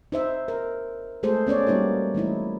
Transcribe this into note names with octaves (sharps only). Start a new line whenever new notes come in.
D#4 C5 E5
A#4
G#3 A3 G#4 A4 C5
B3 C#4 C#5 D5
G3 A#3 D#4 F#4 A#4
E3 A3 D#4 E4